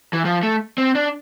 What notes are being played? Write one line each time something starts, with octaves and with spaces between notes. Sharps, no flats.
E3
F3
A3
C4
D4